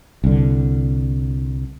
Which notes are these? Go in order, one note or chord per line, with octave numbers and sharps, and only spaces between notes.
C2 D3